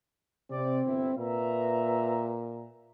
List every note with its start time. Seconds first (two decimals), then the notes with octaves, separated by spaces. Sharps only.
0.50 C3 C4 D5
0.85 G1 E4
1.18 A#2 B4 E5 A#5